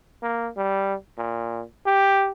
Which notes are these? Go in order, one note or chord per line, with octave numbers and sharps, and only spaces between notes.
A#3
G3
A#2
G4